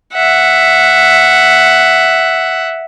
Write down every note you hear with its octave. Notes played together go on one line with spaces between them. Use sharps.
E5 F#5